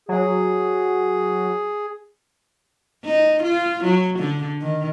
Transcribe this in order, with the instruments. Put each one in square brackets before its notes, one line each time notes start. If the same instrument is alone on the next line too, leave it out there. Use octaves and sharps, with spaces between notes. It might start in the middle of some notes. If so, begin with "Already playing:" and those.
[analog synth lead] F#3 [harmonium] G#4
[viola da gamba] D#4
F4
F#3
D3
D#3